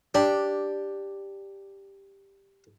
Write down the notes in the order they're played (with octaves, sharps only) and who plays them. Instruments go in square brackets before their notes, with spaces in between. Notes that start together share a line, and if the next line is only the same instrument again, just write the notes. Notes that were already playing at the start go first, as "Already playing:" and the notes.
[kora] D4 [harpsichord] G4